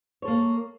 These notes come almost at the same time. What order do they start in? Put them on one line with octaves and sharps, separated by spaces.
C#5 A4 A#3